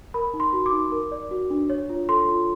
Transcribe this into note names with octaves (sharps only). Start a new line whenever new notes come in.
A#4 B5
D#4
C6
F#4
D6
D#4
A#4
D5
F#4
D4
C#5
F4
A4 C6
F4